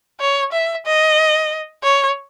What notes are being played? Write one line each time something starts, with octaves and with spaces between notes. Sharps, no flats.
C#5
E5
D#5
C#5